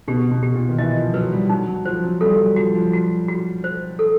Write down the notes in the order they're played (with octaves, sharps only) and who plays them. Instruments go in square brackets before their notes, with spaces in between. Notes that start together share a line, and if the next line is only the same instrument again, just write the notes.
[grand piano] B2 [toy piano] G4
[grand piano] B2
[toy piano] G4
[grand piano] A#2
D#3
[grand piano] E3 [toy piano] D#5
[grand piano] F3
[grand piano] F#3 [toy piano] B4
[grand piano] G3
[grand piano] F#3 [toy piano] D#4
[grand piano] F#3
[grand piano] F3 [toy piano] C5
[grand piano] F#3
[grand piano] G3 [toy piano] A4
[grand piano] F#3
[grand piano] F3 [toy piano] F#4
[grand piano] F3
[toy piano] F#4
F#4
C5
A4